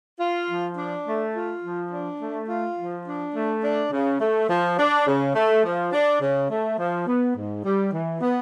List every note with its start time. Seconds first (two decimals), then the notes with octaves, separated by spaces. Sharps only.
0.19 F4
0.49 F3
0.77 D4
1.06 A3
1.35 F4
1.63 F3
1.91 D4
2.21 A3
2.49 F4
2.78 F3
3.06 D4
3.34 A3
3.63 D4
3.92 C#3
4.20 A3
4.49 F3
4.78 D4
5.07 C#3
5.35 A3
5.64 F3
5.92 D4
6.21 C#3
6.50 A3
6.78 F3
7.07 B3
7.36 G#2
7.64 G3
7.93 E3
8.21 B3